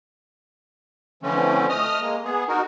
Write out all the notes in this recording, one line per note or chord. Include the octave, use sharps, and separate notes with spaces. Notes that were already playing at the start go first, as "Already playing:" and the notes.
D3 E3 F3 A3 C4 C#4
A3 D#5 D#6 F6
G#3 A#3
B3 G#4
D#4 F#4 A#4